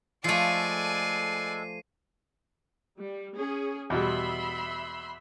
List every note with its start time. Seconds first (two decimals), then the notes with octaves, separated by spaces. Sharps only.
0.24 F3 G#3 A3 A4 D5 G#5 C7 D#7
2.97 G3
3.38 C#4 G#4
3.90 E2 B2 G3 E5 B5 C6